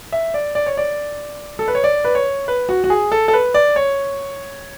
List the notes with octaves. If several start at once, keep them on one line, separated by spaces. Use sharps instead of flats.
E5
D5
D5
C#5
D5
A4
B4
C#5
D5
B4
C#5
B4
F#4
F#4
G#4
A4
A4
B4
D5
C#5